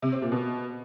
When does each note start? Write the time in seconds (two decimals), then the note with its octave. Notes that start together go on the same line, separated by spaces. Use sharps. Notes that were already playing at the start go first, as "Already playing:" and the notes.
0.02 C3
0.12 C4
0.22 A#2
0.32 B2